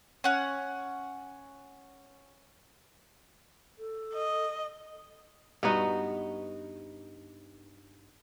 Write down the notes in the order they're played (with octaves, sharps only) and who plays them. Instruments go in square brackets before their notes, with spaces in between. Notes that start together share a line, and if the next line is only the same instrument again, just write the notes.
[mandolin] C#4 F#5
[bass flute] A4
[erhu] D#5
[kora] G2 B3 D#4 F#4